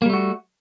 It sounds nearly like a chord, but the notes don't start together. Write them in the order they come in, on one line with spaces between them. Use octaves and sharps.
A#3 G3 A3 F#4